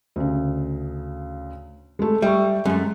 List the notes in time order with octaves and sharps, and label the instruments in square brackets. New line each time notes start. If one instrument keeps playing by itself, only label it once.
[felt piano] D2 C#3
G#3 A3
[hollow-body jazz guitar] G3 [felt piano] E5 C#6
[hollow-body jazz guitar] F#2 A3 [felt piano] G#3